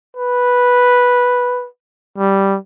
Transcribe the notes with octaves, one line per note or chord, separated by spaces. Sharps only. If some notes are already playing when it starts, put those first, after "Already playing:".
B4
G3